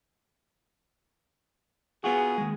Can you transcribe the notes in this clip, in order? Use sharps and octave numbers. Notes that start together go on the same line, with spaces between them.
B3 F4 F#4 G#4
D#2 G#3